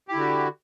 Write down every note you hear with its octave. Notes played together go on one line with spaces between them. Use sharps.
D3 E4 F#4 G4